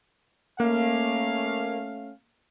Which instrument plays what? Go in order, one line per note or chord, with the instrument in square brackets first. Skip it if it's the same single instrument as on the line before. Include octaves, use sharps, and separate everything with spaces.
[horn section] A3 C#4 F5 [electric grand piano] A#3